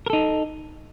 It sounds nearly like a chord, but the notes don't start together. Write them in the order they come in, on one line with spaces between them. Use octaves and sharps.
A#4 A4 D#4